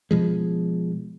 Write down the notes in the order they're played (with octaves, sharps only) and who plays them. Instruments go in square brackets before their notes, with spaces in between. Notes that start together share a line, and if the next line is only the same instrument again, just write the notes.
[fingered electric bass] B2 F3 G#3